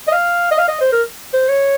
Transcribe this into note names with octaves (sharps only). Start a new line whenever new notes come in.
D#5
F5
D#5
F5
D#5
C5
A#4
C5
C#5